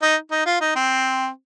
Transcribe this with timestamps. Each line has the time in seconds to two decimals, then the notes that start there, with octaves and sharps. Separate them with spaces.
0.02 D#4
0.31 D#4
0.46 F4
0.61 D#4
0.76 C4